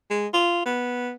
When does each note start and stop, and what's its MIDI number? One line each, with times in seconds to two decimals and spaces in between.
0.11 0.27 56
0.34 0.61 65
0.66 1.13 59